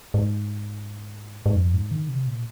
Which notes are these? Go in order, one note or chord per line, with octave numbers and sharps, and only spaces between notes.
G#2
G#2
F2
G#2
D#3
C3
A#2